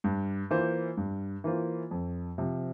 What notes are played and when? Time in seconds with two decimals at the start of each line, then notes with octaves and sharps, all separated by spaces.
0.04 G2
0.51 E3 A#3 F4 C5
0.97 G2
1.44 E3 A#3 F4 C5
1.91 F2
2.38 C3 F3